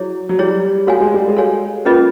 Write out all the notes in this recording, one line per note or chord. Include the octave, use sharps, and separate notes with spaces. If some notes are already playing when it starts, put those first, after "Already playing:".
Already playing: F#3 E4 G#4 C#5
F#3
G3 E4 G#4 C#5
A3 F#4 A4 C#5 F5 G#5
G#3
G3
G#3
F#4 A4 C#5 F5 G#5
A#3 C#4 F4 G#4 B4 D#5